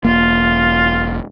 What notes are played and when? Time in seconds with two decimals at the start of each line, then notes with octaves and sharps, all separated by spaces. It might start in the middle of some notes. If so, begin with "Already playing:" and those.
0.05 E1 A#3 F4